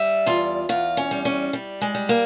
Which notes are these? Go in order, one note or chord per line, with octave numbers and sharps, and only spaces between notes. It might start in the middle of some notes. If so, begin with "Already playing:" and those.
Already playing: G3 E5
E2 F4
E2 F4
C#4
G3
C#4
G3
G#3
G3
A#3